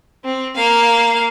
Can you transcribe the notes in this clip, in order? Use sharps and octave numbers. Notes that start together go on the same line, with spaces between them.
C4
A#3 F5